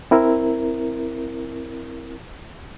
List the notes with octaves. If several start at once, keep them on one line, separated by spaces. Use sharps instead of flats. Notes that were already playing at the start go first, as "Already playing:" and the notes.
C4 E4 A#4